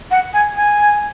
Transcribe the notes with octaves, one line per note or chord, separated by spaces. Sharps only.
F#5
G#5
G#5